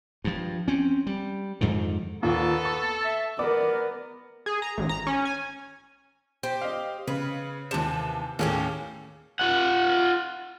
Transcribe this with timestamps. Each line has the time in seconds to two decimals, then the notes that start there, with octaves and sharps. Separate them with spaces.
0.24 G2 F3
0.68 C4 C#4
1.07 G3
1.61 F2 G#2 D3 D#3
2.23 D#2 A#2 B3 A4
2.65 C#6
3.05 E5
3.39 B3 A#4 D5 D6
4.46 G#4
4.62 A#5
4.78 A1
4.89 A#5
5.07 C#4
5.25 G#5
6.43 G4 C5
6.61 D#5 F5
7.08 C#3 B4
7.71 D#2 C3 E3 A5 E7
8.39 D#2 A2 A#3 C#4 G4 G#4
9.39 F4 F#5